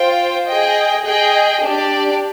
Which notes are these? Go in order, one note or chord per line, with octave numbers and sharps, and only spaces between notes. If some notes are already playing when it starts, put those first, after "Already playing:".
Already playing: F4 C5 G5
G#4 D#5 G5
G#4 D#5 G5
D4 G4 D5